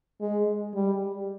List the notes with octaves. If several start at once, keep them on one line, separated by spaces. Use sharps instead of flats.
G#3
G3